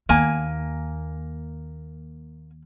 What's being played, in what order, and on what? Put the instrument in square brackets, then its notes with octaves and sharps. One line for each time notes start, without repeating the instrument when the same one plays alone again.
[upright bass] D#2 [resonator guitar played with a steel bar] A#3 G#5